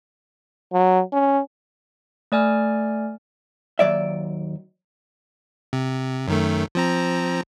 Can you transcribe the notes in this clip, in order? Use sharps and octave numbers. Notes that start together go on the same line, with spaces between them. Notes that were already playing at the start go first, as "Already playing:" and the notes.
F#3
C#4
A3 D5 G#5 F6
D#2 F#3 D5 E5
C3
F#2 D#3 A3
F3 C4 A#5